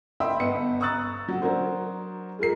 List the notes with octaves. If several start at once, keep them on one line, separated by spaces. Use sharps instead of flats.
D#5 E5 G5 B5 C6 E6
G1 B3 D#5 C#7
A#5 C#6 D#6 E6 F#6 A6
F#3 F#4
F#3 D4 F#4 A#4 C5
G#3 F4 A#4 C7